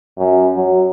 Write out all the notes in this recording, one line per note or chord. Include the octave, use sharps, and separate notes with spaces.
F#2
F#3